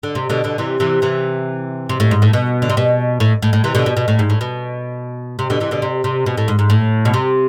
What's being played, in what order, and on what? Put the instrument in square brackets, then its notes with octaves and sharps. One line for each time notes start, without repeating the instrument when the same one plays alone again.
[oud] D3
C3
B2 D3
B2 D3
C3 E3
C3 E3
C3 E3
C3
A2
G#2
A2
B2
D3
C3
B2
A2
A2
A2
C3 E3
B2 D3
B2
B2
A2
G#2
A2
B2
C3
B2 D3
C3 E3
B2 D3
C3
C3
B2
A2
G#2
G#2
A2
B2
C3